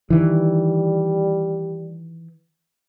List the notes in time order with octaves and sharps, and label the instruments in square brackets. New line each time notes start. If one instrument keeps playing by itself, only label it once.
[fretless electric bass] D#3 E3 [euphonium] G3